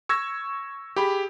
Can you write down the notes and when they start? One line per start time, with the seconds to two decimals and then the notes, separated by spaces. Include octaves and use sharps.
0.09 C#6 E6 G#6 A#6
0.96 G4 G#4 B5